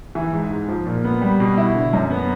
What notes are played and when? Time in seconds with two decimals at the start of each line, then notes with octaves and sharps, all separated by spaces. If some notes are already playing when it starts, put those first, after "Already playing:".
0.15 E3
0.33 G#2
0.50 G#2
0.69 F3
0.86 A#2
1.04 B3
1.21 G3
1.40 B2
1.57 E4
1.75 D3
1.93 F#2
2.11 B3